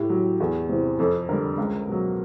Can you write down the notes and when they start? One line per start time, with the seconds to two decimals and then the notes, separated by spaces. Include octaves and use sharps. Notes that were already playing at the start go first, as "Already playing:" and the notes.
Already playing: A2 G4
0.10 F#3
0.40 E2
0.69 C3 E3
0.99 F2 A4
1.29 D3 G3 A#4
1.57 C#2
1.88 B2 F#3